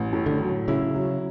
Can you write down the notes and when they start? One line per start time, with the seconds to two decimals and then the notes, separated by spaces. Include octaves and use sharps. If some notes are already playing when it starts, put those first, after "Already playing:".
Already playing: A1
0.13 A2
0.26 D3
0.41 F#3
0.68 C#3 E4
0.95 F#3